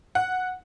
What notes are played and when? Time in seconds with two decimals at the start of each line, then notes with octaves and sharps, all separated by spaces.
0.15 F#5